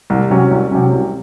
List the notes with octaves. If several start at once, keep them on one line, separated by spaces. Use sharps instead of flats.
C2
C3 F#3 C#4
C2
C3 F#3 C#4
C2